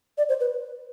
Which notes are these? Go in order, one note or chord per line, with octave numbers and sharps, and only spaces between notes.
D5
C5
B4